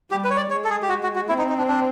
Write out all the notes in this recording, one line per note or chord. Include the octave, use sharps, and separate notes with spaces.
G3 G4
B4
C#5
D5
G#3 C#5
A4
G#4
G4
F#4
F#4
F#4
C4 E4
D#4
D#4
D4
D4